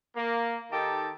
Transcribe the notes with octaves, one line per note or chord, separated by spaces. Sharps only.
A#3
D#3 D#4 G4 A4 A5